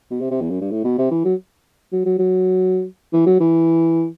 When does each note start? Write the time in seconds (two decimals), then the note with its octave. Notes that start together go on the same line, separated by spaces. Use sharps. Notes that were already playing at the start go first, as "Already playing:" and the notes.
0.11 B2
0.21 C3
0.31 C3
0.41 E2
0.51 F#2
0.61 G2
0.71 A2
0.84 B2
0.98 C3
1.11 E3
1.25 F#3
1.92 F#3
2.06 F#3
2.19 F#3
3.13 E3
3.26 F#3
3.40 E3